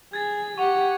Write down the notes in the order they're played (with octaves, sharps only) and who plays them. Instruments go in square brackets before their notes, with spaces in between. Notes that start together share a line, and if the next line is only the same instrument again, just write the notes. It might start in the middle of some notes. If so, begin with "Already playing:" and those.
[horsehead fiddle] G#4 [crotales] G#6 A6
[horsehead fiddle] G4 [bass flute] F#5 [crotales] C#6 F7